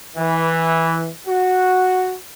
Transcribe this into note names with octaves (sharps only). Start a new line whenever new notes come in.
E3
F#4